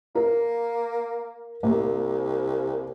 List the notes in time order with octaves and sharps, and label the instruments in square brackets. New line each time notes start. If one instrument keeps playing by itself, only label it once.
[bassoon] A#3 [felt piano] A#4
[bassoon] C2 [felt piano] A#3